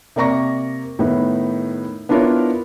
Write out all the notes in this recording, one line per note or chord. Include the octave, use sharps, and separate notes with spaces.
C3 A#3 D5 A#5 C#6 A#6
A2 D#3 B3
B3 D4 E4 F4 A#4 C#5